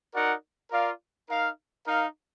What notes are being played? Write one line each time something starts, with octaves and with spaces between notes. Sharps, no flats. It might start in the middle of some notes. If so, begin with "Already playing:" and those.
D#4 F#4 A#4 D5 F#5
F4 A#4 D5 F5
D#4 A#4 F5
D#4 A#4 F5